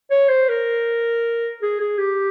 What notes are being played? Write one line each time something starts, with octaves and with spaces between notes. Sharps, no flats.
C#5
C5
A#4
G#4
G#4
G4